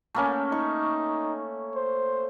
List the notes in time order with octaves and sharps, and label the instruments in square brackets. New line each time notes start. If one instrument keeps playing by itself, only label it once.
[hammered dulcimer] A3 A#3 C#4
[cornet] D#4 [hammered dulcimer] C#6
[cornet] C5